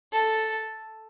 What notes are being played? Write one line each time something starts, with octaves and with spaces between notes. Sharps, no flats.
A4